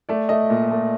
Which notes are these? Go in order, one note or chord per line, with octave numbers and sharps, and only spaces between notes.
A3 D5
A3 D#5
A#2
A3